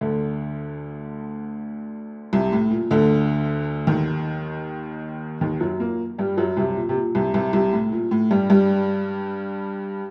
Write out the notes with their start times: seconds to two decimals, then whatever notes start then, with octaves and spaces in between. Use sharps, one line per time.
0.01 D2 D3
2.33 C2 C3
2.52 A2
2.71 A#2
2.91 D2 D3
3.87 D#2 D#3
5.41 D#2 D#3
5.60 F#2 F#3
5.79 A#2 A#3
6.18 G2 G3
6.37 F#2 F#3
6.57 C2 C3
6.76 A#2
6.89 C3
6.96 A#2
7.15 C2 C3
7.34 C2 C3
7.53 C2 C3
7.73 A2
7.92 A#2
8.11 A2
8.31 G2 G3
8.50 G2 G3